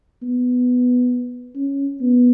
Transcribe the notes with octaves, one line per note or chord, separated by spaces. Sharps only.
B3
C#4
B3